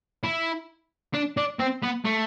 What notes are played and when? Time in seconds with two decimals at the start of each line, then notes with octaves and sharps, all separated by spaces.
0.24 E4
1.14 D4
1.37 D4
1.59 C4
1.83 B3
2.05 A3